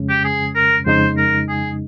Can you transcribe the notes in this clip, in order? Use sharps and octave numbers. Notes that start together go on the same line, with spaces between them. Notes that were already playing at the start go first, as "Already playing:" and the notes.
Already playing: F2 C#3 G#3 C#4
G4
G#4
A#4
F2 C#3 G#3 D#4 C5
A#4
G#4